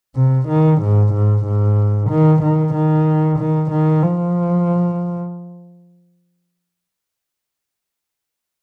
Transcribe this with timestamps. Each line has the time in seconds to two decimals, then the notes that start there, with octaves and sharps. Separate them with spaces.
0.16 C3
0.48 D#3
0.81 G#2
1.13 G#2
1.45 G#2
2.10 D#3
2.42 D#3
2.74 D#3
3.39 D#3
3.71 D#3
4.02 F3